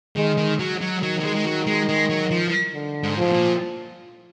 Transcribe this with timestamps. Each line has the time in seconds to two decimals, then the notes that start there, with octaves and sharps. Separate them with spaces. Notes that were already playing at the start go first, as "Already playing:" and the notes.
0.17 D#3 G#3
0.38 D#3
0.59 F#3
0.81 F#3
1.02 D#3 F#3
1.20 F#3
1.23 G#3
1.36 G#3
1.45 F#3
1.67 G#3
1.89 G#3
2.10 F#3
2.31 F3
2.74 D3
3.03 G#2
3.17 G#2 F3
3.32 A#2